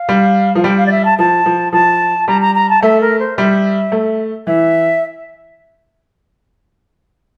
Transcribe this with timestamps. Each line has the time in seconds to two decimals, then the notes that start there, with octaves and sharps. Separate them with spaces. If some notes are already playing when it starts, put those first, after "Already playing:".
Already playing: F5
0.09 G3
0.55 F3 F5
0.63 G3 G5
0.77 F5
0.86 D5
0.91 E5
1.05 A5
1.18 F3 A5
1.46 F3
1.73 F3 A5
2.28 G3 A#5
2.42 A#5
2.55 A#5
2.70 A5
2.82 A3 E5
3.01 A#4
3.19 C5
3.37 G3 E5
3.92 A3
4.47 E3 E5